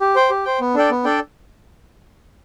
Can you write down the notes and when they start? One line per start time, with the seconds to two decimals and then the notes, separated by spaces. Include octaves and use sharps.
0.01 G4
0.16 C5 G5
0.30 G4
0.45 C5 G5
0.60 B3
0.74 D4 A4 D5 G5
0.90 B3
1.04 D4 A4 D5 G5